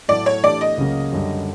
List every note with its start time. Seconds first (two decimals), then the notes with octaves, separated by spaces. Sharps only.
0.09 A2 F#3 A3 D5
0.26 C#5
0.43 E3 A3 D4 G4 D5
0.61 D#5
0.78 C#2 C#3 F#3 A#3 C#4
1.13 F#2 D3 G3